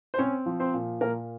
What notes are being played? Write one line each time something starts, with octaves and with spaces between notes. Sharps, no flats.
C5
C4 C#4 C#5
F3
C4 C5
A#2
A#2 A#3 A#4